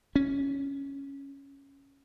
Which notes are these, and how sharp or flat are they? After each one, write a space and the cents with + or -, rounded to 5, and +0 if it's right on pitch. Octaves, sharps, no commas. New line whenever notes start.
C#4 +0